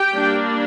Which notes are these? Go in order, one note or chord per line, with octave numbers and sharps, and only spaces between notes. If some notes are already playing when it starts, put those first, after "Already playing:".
Already playing: G4 G5
G3 A#3 D4